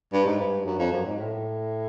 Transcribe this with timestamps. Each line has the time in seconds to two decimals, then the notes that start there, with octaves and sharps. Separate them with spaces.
0.13 G2
0.26 G#2
0.39 G2
0.66 F#2
0.79 F2
0.92 F#2
1.05 G#2
1.18 A2